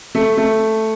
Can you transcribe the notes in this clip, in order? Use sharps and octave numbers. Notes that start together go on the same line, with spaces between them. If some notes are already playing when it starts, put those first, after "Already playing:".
A3
A3